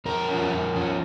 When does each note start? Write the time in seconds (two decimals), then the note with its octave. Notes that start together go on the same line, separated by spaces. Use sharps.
0.05 F2 A#4
0.29 F3 C#4
0.51 F2
0.75 F3 C#4